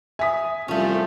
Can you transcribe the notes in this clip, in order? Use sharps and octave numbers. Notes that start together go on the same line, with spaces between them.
E5 G#5 D#6 B6
C2 F3 G3 A3 C#4 F4